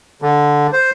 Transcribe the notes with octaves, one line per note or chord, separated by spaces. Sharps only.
D3
C5